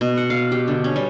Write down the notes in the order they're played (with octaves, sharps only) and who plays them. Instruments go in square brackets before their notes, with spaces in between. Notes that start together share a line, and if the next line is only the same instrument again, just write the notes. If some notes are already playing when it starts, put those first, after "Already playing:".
[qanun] B2
F#5
F5
G4
D3
C#4
G3